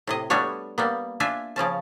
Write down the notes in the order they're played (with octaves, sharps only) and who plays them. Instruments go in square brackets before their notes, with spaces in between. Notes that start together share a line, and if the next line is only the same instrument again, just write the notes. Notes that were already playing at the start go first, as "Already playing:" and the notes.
[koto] A2 C3 D#5
G3 A3 B3 D4 F#4 C#5
G3 A#3 B3
D4 F4 E5 G#5
C#3 F3 C#4 A5